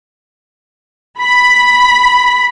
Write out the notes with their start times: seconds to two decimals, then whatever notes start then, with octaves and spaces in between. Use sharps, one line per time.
1.20 B5